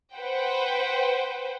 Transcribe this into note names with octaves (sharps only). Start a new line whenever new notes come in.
B4 C5 F#5 G5